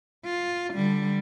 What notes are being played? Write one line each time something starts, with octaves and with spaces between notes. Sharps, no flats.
F4
D3 G3